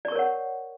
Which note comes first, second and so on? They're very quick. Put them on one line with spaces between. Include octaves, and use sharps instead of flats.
D5 C#6 A#4 C#5 F#5